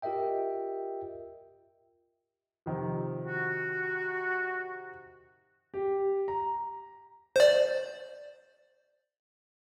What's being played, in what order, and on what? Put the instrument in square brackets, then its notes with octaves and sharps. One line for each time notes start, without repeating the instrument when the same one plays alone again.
[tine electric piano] F4 G4 A#4 D#5 E5 G5
[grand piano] C3 D#3 F3
[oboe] F#4
[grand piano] G4
A#5
[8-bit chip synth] C5 D5